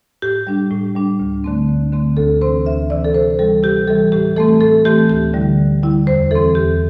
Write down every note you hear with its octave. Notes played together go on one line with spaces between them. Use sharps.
A2 G4
G3 D4
A2
G3 D4
D2
D3 A3 C4
D2
D3 A3 C4
D2 A4
C3 E3 C4 C5
D2 E5
C3 E3 C4 D5
A4
C3 C5
E3 G3 A4
C3 G4
E3 G3 A4
A2 G4
E3 A3 C4 A4
A2 A4
E3 A3 C4 G4
D2 G4
D3 G3 E4
D2
D3 G3 E4
E2 C5
E3 C4 A4
E2 G4